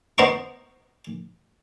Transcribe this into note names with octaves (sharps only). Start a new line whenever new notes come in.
B3 C5 D#5 A#5 C#6